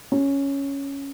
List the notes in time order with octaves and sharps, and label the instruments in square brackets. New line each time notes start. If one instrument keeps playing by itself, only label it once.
[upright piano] C#4